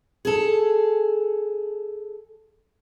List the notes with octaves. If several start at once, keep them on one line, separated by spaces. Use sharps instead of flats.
G#4 A4